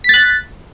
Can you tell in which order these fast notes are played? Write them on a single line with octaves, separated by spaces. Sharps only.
B6 A6 F#6